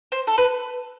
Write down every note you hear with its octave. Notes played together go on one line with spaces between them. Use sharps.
C5
A4
B4